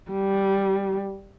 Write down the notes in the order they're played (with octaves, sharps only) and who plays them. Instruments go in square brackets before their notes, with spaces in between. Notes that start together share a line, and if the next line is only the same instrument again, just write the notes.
[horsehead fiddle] G3